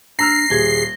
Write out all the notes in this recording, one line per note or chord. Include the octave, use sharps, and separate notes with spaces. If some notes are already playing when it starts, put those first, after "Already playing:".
D4 A#5 E6 F6 A#6 C7
D#1 G#4 G#6 G7